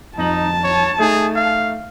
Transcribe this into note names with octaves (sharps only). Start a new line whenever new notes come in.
F2 D#4 A5 A#5 F#7
C#5
A3 D#4 G#4
F5